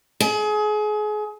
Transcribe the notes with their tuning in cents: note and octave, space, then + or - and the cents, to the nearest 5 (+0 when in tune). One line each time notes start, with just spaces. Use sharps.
G#4 +30